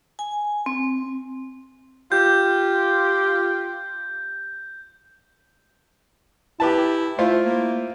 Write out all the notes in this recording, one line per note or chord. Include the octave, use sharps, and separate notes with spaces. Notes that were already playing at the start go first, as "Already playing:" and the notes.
G#5
C4
F4 G4 G6
E4 G4 B4 A5
A3 E4 F4 C5
A#3